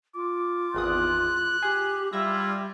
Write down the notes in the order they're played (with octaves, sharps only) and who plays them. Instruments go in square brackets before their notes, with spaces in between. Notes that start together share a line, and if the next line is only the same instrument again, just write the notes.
[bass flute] F4 [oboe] D6
[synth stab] G#1 E2 D#6 [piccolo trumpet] F#6
[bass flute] G4 [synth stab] G#4
[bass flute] G3 [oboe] E4 [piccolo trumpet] F4 [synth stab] E5 E6 A#6